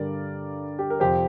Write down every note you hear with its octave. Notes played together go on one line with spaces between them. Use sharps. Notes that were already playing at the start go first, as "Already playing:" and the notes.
Already playing: G2 D3 G3 A#4 D5
G4
A#4
F2 C3 F3 G4 C5